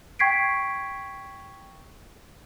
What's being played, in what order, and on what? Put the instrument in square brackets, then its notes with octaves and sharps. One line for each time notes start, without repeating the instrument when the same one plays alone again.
[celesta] G5 C#6 G#6 B6 C7 D7